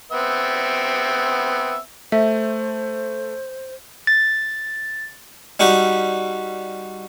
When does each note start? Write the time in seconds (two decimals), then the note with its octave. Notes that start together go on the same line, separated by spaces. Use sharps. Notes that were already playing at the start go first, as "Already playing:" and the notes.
0.12 B3 C4 E5
2.12 A3 C5 E5
4.07 A6
5.60 G3 D#4 F#4 G4